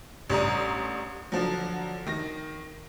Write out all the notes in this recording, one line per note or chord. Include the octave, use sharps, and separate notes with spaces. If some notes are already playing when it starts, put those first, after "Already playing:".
A1 G3 D4 A#5 D#6
D3 F3 F#3
D#3 A#6